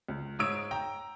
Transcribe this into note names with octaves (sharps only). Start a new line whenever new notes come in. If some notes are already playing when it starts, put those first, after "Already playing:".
C#2
G#2 C#5 D#6 E6 D7
G5 A#5